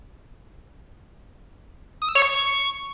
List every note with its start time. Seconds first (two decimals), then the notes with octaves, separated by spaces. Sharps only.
2.02 D#6
2.09 E6
2.15 C#5
2.22 C#6